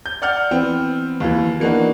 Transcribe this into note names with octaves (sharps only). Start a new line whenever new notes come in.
G6
D5 F#5 F6 G6
E3 B3 C4
D#2 E3
E3 A#3 B3 D4 D#4 F#4